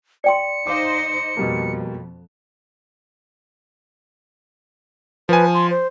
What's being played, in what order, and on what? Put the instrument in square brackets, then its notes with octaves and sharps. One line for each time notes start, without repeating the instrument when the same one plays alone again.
[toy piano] D5 G5 C6 [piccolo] C#7
[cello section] D#4 C5 D#5 [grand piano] F5 D6
[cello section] F2 [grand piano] B2 G3 A#3
[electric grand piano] F3 G#5 [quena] B4
[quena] C6
C5